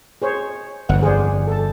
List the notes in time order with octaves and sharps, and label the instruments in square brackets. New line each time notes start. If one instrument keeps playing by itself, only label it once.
[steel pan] G#4 C5 C#5
[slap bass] G1 F2 [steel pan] F#5
[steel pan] G#4 C5 D5
A4 A5